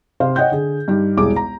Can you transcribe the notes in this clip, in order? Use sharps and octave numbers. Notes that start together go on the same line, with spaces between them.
C3 C5 F5
C#5 D#5 F#5 G5 G6
D3 G#4
G2 D#4 G4
E1 C2 E4 G#4 D6
A#5